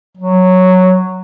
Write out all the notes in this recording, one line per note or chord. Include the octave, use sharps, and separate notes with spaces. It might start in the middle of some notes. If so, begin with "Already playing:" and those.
F#3